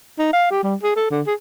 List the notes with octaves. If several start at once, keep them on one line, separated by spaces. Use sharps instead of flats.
D#4
F5
G4
G3
G#4
A4
D3
G#4